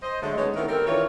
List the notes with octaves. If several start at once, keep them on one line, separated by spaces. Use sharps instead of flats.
C5 D#5
D3 F#3 G#3 A3
G#3 B3 C#4 D#4 C#5 D#5
D#3 A3 B3 C4 E4 A#4
C4 G4 A4 A#4
D#3 E3 D4 F4 C#5